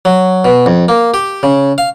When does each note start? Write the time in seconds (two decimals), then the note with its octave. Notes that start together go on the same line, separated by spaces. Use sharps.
0.05 F#3
0.45 B2
0.66 F2
0.88 A#3
1.14 G4
1.43 C#3
1.78 F5